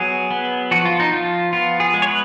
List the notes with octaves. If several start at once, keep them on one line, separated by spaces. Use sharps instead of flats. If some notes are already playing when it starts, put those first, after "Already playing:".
Already playing: F#3 B3 G#4
B3
F3 F#4
F4
D#4
F3 F4
B3 F4
G#4
G#3
C#5
B4